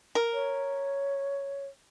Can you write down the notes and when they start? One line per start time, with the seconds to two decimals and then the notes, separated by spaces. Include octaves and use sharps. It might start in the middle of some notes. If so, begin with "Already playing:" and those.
0.15 A#4
0.34 C#5